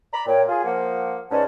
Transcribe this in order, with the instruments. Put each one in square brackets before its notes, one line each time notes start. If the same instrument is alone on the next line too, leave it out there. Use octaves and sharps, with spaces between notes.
[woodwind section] D5 A#5 B5
[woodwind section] A#2 [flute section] C#5 G5
[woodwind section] F4 G#4 [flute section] G#5
[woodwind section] F3 A#3 [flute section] F#5
[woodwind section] G#2 C#4 [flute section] B4 D5 A5